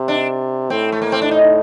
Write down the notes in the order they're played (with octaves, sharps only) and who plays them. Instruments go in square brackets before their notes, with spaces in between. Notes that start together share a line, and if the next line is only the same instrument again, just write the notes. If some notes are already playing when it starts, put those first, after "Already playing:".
Already playing: [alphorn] C3
[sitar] D4
[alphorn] A2 [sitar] C4
[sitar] A3
A#3
C4
D4
D#4